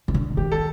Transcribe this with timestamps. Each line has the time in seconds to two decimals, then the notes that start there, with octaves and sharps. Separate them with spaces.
0.08 D#3
0.14 D3
0.37 D#3 G4
0.52 A4